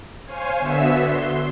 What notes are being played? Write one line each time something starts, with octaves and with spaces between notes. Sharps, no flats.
C5 C#5 F5 G#5
D3 B3 F#4 E5 E6 E7
C6